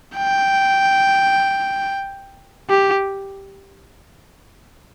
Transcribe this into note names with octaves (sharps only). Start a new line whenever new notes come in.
G5
G4